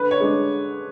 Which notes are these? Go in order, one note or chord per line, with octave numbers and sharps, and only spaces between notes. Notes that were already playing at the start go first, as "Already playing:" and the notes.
Already playing: D3 B4
C#5
G#3 D4